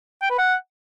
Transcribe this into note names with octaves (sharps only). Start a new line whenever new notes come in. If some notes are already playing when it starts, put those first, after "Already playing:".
G5
B4
F#5